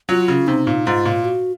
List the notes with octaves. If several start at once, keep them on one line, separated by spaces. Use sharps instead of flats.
F#3 F4
C#3
C3 D#4
A#2
G#2 F4
A#2
F#4